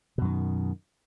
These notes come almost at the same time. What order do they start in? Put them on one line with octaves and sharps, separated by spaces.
B2 F#2 D#3